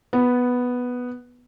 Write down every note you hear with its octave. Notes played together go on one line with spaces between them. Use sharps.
B3